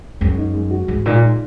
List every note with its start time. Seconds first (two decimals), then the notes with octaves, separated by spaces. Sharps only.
0.21 F#2 G#3
0.38 D#4
0.54 G#3
0.71 F#4
0.88 G#2 G#3
1.06 A#2 D#4
1.22 G#3